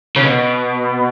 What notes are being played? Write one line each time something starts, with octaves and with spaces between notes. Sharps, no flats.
C#3
B2